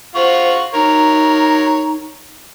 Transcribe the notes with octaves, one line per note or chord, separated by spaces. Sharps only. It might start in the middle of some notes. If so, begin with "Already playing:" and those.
F4 C5 F#5 C#6
D#4 A#4 C#5 A#5